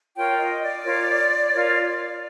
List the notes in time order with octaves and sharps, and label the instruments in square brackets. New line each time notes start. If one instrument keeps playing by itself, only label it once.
[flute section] F4 A#4 C#5 G5
D#5
D5
F4 A#4 C#5
F4 A#4 C#5